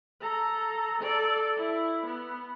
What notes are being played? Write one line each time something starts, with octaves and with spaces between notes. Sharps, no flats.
A4 A#5
A4 D5
E4
B3